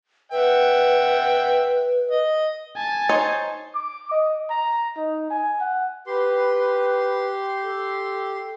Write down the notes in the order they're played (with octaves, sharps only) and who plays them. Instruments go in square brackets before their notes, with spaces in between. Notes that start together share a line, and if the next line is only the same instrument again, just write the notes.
[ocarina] B4 [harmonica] E5 F#5 G5
[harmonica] D#5
[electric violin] G#5 A5
[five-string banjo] D#4 C5 C#5
[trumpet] D6
D#5
A#5
D#4
G#5
F#5
[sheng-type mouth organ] G4 C6 [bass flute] B4
[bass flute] A4